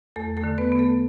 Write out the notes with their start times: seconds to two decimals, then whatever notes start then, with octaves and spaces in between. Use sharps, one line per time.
0.16 E2 A3 A4
0.37 A3 A4
0.44 D3
0.58 B3 B4
0.72 B3
0.78 A3 A4